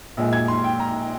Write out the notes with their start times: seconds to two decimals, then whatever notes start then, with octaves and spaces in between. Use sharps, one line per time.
0.17 A#1 A#2 G#3
0.33 G#6
0.48 C6
0.64 G5
0.80 A#5